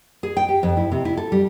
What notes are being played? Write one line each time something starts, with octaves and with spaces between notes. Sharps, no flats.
G#4
G5
G4
F2
E4
C3
E4
A4
G3